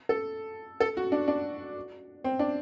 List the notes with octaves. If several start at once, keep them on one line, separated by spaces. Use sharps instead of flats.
A4
A4
F#4
D4
D4
C4
D4